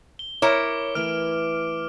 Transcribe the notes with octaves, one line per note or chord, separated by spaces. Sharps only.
G7
E4 A#4 C#5 D6
E3 A3 F6 D7